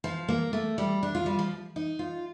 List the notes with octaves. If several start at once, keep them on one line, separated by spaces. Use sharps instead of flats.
F3
A#3
A3
G3
D4
F4
G3
F3
D#4
F4